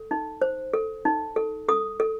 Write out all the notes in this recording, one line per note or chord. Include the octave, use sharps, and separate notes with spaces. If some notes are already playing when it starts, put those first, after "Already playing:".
Already playing: A4
D#4
C5
A4
D#4
A4
A4 D#6
A4